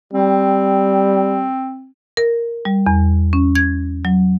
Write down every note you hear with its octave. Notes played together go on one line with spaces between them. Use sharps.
G3 C4
A#4
G3
E2
C#4
G#6
F#3